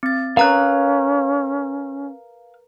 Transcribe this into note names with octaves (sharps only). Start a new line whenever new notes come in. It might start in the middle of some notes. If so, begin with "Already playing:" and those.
C4 A6
C#4 A#4 B4 F5 A#5 F#6